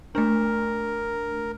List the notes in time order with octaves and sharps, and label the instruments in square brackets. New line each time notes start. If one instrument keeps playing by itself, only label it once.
[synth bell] A3 D4 [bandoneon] A#4